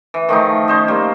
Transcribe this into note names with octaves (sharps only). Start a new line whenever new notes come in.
E3
D#3 F3 A3 D#4
C#4 C5 D#5
G3 A#3